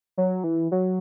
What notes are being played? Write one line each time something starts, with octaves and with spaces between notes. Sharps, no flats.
F#3
E3
F#3